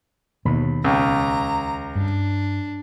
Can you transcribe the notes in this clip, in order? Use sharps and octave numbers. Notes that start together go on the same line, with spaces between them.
D#2 B2 B5
C#2 A#5
G2 D4